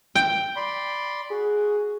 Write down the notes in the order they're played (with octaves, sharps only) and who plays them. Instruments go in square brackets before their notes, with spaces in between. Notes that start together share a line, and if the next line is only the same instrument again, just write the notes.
[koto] G5
[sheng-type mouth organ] D5 B5 C6
[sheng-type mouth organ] F#4 [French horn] G#4